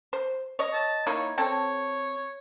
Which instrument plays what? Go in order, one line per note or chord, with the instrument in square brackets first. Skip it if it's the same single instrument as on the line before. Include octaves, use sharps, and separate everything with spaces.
[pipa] C5
C#5 D#5
[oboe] A5
[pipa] A#3 D#4 E4 [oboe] C#5
[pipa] C4 A4 [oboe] C#5